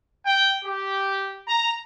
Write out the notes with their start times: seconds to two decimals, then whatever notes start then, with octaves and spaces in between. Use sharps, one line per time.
0.25 G5
0.64 G4
1.48 A#5